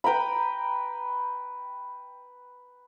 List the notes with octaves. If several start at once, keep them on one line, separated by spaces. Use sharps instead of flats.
B4 G5 A#5 B5